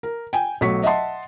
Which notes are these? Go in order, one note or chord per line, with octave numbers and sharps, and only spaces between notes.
A#4
G5 G#5
B1 F#3 A3 C#6 B6
D#5 E5 F#5 A5 C6